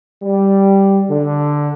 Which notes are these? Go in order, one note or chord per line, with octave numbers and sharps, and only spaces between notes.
G3
D3